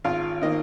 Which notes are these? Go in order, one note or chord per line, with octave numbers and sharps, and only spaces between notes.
G#1 F4 F5
D#3 A#3 D#4 D#5